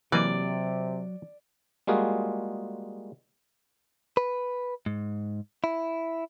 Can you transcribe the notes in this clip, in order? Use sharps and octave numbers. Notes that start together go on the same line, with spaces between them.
C3 E3 F#3 A#3 D5 D#5
G3 G#3 A#3 F4 F#4 G#4
B4
G#2
E4